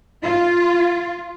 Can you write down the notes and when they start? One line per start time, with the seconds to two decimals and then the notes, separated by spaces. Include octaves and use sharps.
0.23 F4